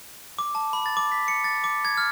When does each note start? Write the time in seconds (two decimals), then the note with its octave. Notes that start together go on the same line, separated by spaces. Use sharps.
0.39 D6
0.55 A5
0.73 B5
0.86 A6
0.97 D6
1.12 B6
1.28 C#7
1.44 A6
1.64 D6
1.85 G#6
1.97 F6